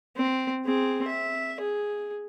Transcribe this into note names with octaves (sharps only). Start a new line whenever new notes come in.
C4
C4 G#4
E5
G#4